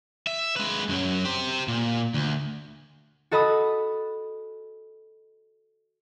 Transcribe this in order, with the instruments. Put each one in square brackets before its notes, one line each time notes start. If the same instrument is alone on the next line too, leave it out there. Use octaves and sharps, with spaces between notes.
[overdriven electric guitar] E5
G#3 B4
F#2 F#3
G4 C5
A#2
D2
[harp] F#4 A4 D#5 B5 D#6